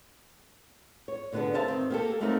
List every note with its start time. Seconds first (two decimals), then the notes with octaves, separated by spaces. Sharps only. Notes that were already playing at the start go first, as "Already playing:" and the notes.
1.08 C#5
1.32 B2 D3 B3 C4 D4 G#4
1.54 A#4 C5 E5 F5 A5
1.68 D#3 C4
1.90 A#3 G4 A4
2.20 F#3 A3 A#3 C4 D#4 A#4